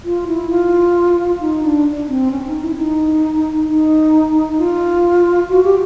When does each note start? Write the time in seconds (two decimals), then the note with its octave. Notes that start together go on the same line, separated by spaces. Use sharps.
0.05 F4
0.27 E4
0.50 F4
1.40 D#4
1.63 D4
2.09 C4
2.31 C#4
2.47 D#4
2.62 E4
2.77 D#4
3.67 D#4
4.58 F4
5.50 F#4
5.64 G4